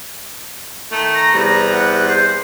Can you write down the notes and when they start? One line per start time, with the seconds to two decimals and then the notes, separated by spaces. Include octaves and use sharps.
0.91 D#3 A3
1.15 A#5
1.34 E2 C3 G3 A#5
1.72 F#5
2.08 C5